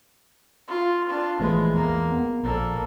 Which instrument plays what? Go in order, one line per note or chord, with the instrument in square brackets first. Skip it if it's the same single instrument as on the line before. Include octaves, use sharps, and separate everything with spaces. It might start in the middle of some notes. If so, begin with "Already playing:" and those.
[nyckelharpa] F4
D4 F4
[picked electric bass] A#1 E3 A3 [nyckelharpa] G#3 B3
[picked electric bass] E2 [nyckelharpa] A#3
[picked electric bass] B3
[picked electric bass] A#1 [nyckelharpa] A#3 A4